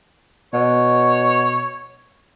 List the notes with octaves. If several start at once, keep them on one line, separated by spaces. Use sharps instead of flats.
B2 C#5